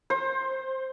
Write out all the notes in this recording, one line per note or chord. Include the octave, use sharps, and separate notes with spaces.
C5